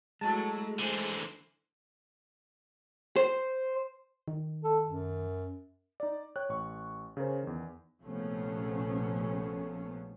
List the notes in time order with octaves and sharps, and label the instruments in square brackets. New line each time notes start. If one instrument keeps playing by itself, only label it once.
[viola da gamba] F#3 A3 E4 [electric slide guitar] G#3 [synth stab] A5
[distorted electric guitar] D3 E3 [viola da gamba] C5
[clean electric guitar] C5
[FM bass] D#3
[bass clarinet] A4
F#2
[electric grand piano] D#4 D5
C#5 G5 F#6
A1 C#6
C#3 C#4 A#4 C5
E2 D#3
[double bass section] A#1 C3 F3 A3 B3 C#4